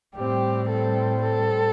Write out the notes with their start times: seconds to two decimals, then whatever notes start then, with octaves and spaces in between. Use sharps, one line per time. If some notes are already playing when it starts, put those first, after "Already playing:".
0.15 A2 G3 C4 G4
0.69 A4
1.23 A4